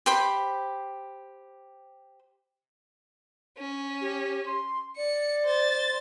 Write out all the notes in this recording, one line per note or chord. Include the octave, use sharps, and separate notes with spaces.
G4 C5 B5
C#4
G4
C6
D5 C#7
C5 A6